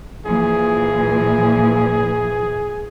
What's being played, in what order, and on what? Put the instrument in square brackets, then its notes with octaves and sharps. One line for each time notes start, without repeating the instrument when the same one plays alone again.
[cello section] A#2 E3 F3 [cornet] G#4